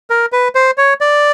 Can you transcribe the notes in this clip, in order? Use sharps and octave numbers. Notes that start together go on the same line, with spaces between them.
A#4
B4
C5
C#5
D5